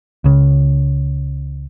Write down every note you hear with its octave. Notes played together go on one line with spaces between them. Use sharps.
C#2 C#3